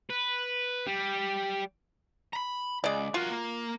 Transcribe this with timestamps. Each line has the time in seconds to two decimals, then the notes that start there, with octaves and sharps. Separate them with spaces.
0.10 B4
0.87 G3
2.33 A#5 B5
2.84 C#2 G#3 D5
3.14 F4 F#4 A#4
3.30 A#3